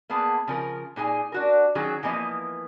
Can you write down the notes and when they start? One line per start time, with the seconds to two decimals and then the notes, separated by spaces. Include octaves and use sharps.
0.10 A#3 B3 G#4 A5
0.47 C#3 F3 A#4
0.96 A#2 D#4 G#4 G#5
1.32 D4 F#4 A#4
1.75 D#3 F#3 C#4 F#4 G#4
2.03 E3 F3 A#3 B3 D#5